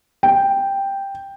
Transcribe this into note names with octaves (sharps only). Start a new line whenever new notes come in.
G5